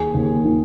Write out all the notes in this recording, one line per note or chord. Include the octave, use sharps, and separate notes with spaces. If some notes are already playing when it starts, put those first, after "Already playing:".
Already playing: D#2 G#4 G#5
D#2
D#3